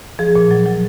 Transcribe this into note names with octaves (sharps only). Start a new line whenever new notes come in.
F3 G#4
A#2
F#3
F#3